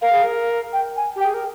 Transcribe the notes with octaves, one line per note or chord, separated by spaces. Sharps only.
A#4 F5
G#4
A#4
G5
G#5
G4 G5
G#4
A#4